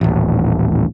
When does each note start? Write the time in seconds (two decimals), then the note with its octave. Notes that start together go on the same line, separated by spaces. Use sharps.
0.01 D#1 A1